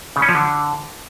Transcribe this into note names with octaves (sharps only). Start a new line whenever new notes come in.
C#3
C#4
F3
D3